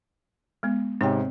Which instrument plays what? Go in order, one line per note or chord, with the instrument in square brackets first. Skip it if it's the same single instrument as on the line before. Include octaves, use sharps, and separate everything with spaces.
[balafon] G#3 B3
[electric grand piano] G#2 C3 [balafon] C4 C#5 G5